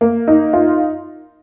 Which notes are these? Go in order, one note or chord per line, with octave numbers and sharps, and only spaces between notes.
A#3
D#4
F4